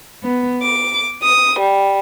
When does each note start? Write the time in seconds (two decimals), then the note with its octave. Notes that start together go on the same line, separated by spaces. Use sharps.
0.22 B3
0.62 D6
1.23 D#6
1.60 G3